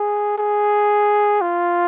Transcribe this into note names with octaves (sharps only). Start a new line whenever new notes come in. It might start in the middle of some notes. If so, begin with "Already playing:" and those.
Already playing: G#4
G#4
F4